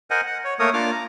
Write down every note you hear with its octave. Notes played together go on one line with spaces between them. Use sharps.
A#4 C5 D#5 F#5 G#5
F#5
C#5
A3 A#3 A#4 C#5 D#6
A#3 D4 F4 D6 F6
A#5